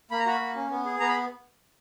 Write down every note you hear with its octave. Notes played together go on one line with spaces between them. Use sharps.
A#3 B5
A#5
F#4 B5
A#3
C#4
B3
G#4
B3 A#5
B5